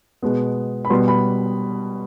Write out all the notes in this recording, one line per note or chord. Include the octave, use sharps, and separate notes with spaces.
B2 G#3 B3
B5
B2 G3 B3 C6
B5